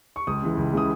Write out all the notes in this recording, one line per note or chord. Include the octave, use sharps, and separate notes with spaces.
C#6
C#2 D#6
C#3 E3 G#3
C#2
C#3 E3 G#3 D#6